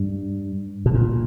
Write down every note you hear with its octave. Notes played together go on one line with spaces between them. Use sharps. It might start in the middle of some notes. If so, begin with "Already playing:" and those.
Already playing: G2
B2
A#2